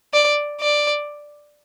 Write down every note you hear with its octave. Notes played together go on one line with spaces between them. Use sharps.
D5
D5